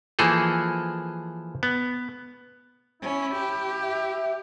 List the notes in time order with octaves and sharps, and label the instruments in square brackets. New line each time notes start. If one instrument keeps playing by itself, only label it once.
[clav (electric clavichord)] E3 F3 A#3 G#4 A4
B3
[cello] C#4 [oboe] E4
[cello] G4
[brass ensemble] E5